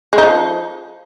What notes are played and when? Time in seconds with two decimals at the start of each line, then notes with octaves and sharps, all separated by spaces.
0.13 G#3
0.18 D#4
0.23 F3